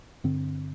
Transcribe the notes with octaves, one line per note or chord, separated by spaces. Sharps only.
G2 D3 C4